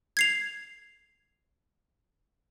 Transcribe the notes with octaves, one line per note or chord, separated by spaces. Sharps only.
G#6 C7 F7